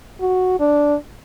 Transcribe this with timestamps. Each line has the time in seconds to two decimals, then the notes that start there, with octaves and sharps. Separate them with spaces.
0.21 F#4
0.60 D4